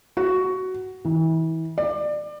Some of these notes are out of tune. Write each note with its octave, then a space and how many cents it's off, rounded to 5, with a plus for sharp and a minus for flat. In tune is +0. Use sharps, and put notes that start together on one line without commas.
F#4 +10
E3 -30
D5 +25